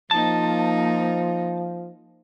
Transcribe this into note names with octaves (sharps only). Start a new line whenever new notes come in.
F3 A#3 D#4 A5